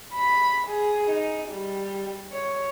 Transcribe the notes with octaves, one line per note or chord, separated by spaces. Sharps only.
B5
G#4
D#4
G3
C#5